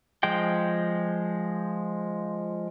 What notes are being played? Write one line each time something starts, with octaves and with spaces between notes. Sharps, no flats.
F3 G#3 G5